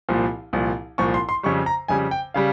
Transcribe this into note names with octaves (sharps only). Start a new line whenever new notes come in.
C2 A#2 F3
C2 A#2 F3
C2 A#2 F3 C#6
C6
C6
F2 C#3 G3 C#6
A#5
F2 C#3 G3 G#5
G5
C#3 G3 F5